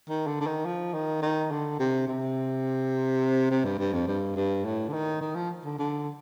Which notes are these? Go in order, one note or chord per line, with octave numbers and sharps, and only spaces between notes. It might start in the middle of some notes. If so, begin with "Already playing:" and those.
D#3
D3
D3
D#3
F3
D#3
D#3
D3
C3
C3
C3
G2
G2
F2
G2
G2
A2
D3
D#3
D#3
F3
D3
D3